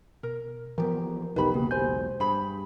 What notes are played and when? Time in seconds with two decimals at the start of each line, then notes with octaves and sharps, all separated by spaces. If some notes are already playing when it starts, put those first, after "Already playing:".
0.23 B2 A#4
0.78 E3 F3 B3 G4 A#4
1.36 E1 B1 B2 D#4 G4 A#4 B4 B5
1.54 C#3 A#3 G4 G#4
1.71 C5 G#5 G6
2.20 G2 G#4 B5